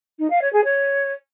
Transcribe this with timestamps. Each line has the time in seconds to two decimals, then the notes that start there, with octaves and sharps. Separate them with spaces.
0.18 D#4
0.30 F5
0.41 C#5
0.52 G#4
0.64 C#5